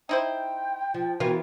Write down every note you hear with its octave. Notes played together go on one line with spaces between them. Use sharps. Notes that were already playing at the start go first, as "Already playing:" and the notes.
D#4 E4 C5 G5
F3 F4
E3 B3 F4 F#4 A#4